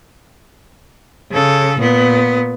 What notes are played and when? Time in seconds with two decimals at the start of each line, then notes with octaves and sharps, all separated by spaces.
1.31 C#3 A4
1.79 A#2 B3